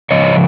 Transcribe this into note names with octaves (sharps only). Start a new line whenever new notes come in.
C#3 F3 C#5 D#5